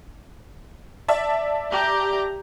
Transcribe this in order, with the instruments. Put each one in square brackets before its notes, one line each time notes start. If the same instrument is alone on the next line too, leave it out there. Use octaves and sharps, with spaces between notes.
[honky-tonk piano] D5 E5 A5
[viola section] G4 A#5